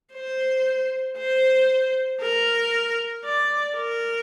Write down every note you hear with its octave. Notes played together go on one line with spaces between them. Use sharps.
C5
C5
A#4
D5
A#4